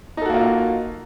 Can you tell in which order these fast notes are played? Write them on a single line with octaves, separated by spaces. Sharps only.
D#4 A4 F#4 A#3 F4